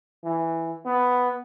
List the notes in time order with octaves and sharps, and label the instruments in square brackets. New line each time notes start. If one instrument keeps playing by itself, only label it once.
[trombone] E3
B3